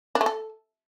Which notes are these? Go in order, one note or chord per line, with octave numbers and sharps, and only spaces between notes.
D4
A3
A4